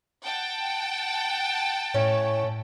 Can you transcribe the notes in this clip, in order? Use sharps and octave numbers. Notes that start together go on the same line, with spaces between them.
F#5 G5 A5
A2 A3 C#4 C#5